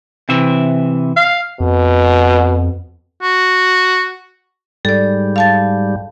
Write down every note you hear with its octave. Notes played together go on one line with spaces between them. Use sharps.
C3 E3 E5
F5
F2 B2
F#4
G#2 G3 A4 D5
F5 A5 A6